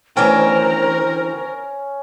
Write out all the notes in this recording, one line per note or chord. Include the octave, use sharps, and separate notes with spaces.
D2 E3 C#4 A#4 C5 G5